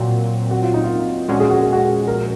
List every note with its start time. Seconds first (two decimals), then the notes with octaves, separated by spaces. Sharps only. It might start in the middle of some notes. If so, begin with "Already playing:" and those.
Already playing: A#2 F#3 C4 F#4
0.51 F#4
0.62 F4
0.74 D#4
0.84 F4
1.29 A#2 F3 G#3 C#4 F#4
1.40 G#4
1.51 F#4
1.63 G#4
1.73 F#4
2.07 A#4